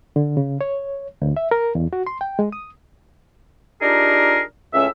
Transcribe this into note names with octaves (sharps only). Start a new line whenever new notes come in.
D3
C#3
C#5
D2
E5
A#4
E2
F#4
C6
G5
G#3
D#6
D4 D#4 F4 G4 G#4 A#4
C#2 A2 C#4 E5